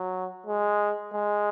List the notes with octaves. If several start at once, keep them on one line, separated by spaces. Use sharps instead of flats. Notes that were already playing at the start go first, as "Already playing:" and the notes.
Already playing: F#3
G#3
G#3